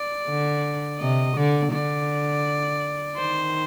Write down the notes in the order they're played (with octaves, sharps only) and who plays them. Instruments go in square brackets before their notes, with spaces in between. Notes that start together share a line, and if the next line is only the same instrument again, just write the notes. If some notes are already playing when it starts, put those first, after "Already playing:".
Already playing: [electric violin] D5
[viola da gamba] D3
[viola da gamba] C3 [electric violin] D#5
[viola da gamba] D3 [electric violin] D5
[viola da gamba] D3 [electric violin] D5
[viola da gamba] D#3 [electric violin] C5